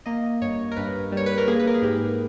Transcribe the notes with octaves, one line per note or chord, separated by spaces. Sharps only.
A#3 D#5
G2 C#5
A#4
G2 B4
G3 C#5
B4
A#4
A#3 G#4
B4
A#4
G#4
G#2 G4